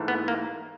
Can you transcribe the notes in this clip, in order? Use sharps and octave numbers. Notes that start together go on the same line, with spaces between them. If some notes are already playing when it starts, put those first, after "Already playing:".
Already playing: G#2 E3 A3
B3
A#3